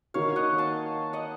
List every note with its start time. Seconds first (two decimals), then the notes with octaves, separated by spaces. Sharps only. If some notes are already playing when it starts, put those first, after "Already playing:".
0.14 D#3 A#3 D#4 F#4 C#5 F5
0.36 D#5 F#5
0.58 F5 A5
1.13 D#5 F#5